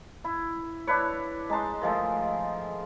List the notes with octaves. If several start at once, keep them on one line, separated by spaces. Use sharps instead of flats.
E4
D4 E4 B4 C#5
G#3 D#4 A5 C6
D#3 F3 G#3 A3